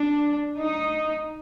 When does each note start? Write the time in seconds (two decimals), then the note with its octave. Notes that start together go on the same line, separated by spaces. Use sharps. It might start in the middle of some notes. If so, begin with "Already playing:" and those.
Already playing: D4
0.57 D#4